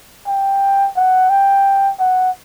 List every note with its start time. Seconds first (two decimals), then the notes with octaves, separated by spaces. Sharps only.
0.27 G5
0.96 F#5
1.30 G5
2.00 F#5